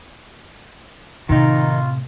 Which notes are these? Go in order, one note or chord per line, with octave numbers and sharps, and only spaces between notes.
A2 C3 D#3 D#4 F4